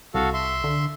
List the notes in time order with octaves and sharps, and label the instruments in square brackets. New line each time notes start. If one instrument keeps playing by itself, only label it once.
[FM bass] C2 [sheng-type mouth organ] F#4 A4 F5
[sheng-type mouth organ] E5 C6
[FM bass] D3